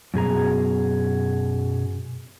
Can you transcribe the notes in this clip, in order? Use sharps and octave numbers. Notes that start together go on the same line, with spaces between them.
F#2 B2 G#4 A#5